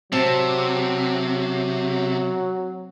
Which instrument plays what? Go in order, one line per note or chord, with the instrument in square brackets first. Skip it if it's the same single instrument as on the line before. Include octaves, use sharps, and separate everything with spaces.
[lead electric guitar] C3 [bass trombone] F#3 [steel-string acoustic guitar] C4 A5